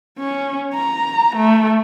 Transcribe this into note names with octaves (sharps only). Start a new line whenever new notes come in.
C#4
A#5
A3